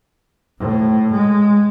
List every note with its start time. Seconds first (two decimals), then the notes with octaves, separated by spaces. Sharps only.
0.59 A2
1.12 G#3